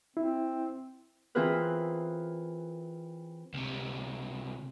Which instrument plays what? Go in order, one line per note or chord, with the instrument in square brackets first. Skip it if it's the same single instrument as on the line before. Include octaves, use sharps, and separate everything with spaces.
[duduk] C4 [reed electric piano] E4
[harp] E3 C4 F4 G#4 A#4 B4
[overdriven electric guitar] C#2 C3